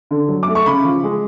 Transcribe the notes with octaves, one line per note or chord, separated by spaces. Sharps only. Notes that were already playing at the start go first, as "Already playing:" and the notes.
D3
F#3
D6
A3
C#6
C#3 B5
F3
G#3